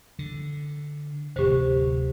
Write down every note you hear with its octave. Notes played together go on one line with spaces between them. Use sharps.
D3
D1 D2 C3 G4 C5